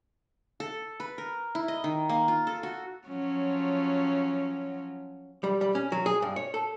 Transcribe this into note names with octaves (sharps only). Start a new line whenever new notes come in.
A4
B4
A#4
E4
D#5
D#3
A#3
F4
A4
F#4
F3 F#3 C#4
G3
G3
C#4
F#3
G#4
G2
C#5
A4